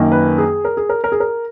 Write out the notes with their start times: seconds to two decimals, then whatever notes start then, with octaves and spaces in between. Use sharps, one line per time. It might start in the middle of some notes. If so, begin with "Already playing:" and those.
Already playing: F#2 D#3 A#3
0.12 B4
0.38 G#4
0.65 A#4
0.77 G#4
0.89 A#4
1.04 A#4
1.12 G#4
1.20 A#4